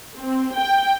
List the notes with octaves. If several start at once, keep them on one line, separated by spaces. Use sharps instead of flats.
C4
G5